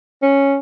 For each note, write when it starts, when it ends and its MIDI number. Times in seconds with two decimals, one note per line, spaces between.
0.22 0.57 61